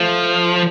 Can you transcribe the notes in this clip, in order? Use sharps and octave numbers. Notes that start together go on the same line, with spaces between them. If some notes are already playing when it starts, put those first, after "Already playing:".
Already playing: F3 A3